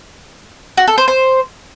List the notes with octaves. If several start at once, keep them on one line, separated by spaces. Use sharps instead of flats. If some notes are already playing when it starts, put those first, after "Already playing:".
F#4
A4
C5
C5